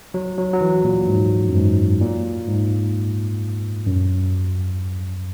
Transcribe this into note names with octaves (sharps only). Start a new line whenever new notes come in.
F#3
F#3
F#3
E3
A#2
G#2
F#2
G#2
A#2
G#2
F#2